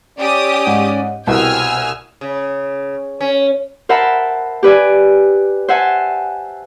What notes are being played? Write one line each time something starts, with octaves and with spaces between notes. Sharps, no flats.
C#4 G4 D5 D#6
G#2
C2 B2 C4 G#5 E6 F6
C#3
C#4
A#4 C5 E5 F#5 A5 B5
G4 B4 D5 G#5
C5 E5 F#5 G#5 A5